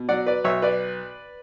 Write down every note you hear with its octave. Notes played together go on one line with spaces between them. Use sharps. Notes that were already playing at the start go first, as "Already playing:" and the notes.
Already playing: B2
F#3 D5 F#5
B4 D5
B1 C#5 E5
B4 D5